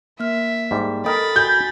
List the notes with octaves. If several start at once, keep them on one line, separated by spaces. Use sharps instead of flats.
A#3 E5 F6
G#2 G3
A4 A#4 D#5 G5 B5 D#6 A6
F#4 G#5 G6